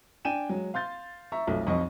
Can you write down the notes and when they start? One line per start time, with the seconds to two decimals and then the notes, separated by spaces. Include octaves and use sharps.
0.25 D4 G5 G#5 D#7 E7
0.49 F#3 G#3
0.74 F5 C6 G6 A6
1.32 E5 A#5 C#6
1.47 B1 F2 F3 A3
1.66 B1 F2 C4 D#5 C#6